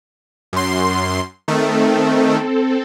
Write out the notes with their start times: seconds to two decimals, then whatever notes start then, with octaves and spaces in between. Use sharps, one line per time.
0.53 F#2 C6
1.48 D#3 A3 C4 A4